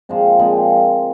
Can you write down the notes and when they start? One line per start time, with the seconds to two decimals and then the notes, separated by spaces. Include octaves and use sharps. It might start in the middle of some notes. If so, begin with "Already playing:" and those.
0.09 A#2 F3 G#3 C4
0.39 A#2 F3 G#3 C4